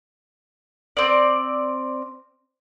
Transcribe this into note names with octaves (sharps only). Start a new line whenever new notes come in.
C4 D5